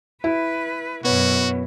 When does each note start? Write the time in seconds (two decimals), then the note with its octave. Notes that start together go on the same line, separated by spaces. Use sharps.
0.24 E4 B4
1.05 F#2 B2 B3 F#4 B4 C#5